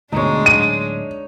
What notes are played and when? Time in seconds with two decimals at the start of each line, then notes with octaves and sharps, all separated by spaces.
0.12 D2 G#2 B2 G#3 D4 D#4 C#5
0.46 D1 D#7